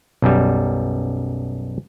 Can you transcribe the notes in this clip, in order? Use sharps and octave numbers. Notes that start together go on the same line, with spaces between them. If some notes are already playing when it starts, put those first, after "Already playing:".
B1 F#2 G3